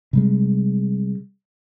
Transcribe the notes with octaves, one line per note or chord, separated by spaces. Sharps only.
C3 G3 G#3